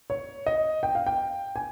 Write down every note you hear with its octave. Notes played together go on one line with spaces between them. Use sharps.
C#5
D#5
G5
F5
G5
G#5